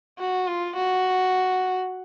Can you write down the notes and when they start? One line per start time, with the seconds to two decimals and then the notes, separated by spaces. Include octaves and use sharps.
0.19 F#4
0.47 F4
0.75 F#4